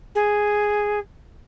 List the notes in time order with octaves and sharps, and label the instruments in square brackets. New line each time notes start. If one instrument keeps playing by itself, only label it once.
[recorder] G#4